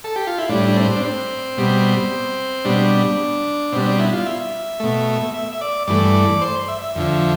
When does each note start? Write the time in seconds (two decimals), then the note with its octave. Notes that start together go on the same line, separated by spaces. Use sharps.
0.04 A4
0.16 G4
0.27 F4
0.38 E4
0.49 A2 G3 D4
0.69 D4
0.77 C4
0.96 D4
1.04 C4
1.57 B2 G3
2.65 B2 G3 D4
3.73 B2 G3 C4
3.86 D4
3.99 E4
4.13 F4
4.26 E5
4.80 B2 A3
5.34 E5
5.52 E5
5.61 D5
5.87 G2 E3 A3 D5
6.41 C5
6.68 E5
6.82 E5
6.96 F2 D3 F3